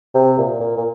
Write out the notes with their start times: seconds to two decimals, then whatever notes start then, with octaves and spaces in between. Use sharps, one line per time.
0.15 C3
0.38 A#2
0.61 A#2
0.77 A#2